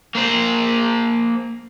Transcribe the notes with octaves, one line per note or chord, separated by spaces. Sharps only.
A#3 C5